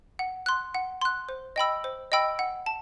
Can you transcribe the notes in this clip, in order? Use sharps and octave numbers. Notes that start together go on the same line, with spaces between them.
F#5
C6 F#6
F#5
C6 F#6
C5
D#5 G5 B5 E6
C5
D#5 G5 B5 E6
F#5
A5